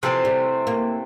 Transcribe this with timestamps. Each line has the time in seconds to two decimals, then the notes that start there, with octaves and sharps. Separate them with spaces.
0.03 C3 E3 F3 A3 C4
0.25 G3
0.67 A#3